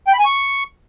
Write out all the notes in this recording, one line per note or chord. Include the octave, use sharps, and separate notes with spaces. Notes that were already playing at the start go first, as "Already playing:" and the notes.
G5
B5
G#5
C#6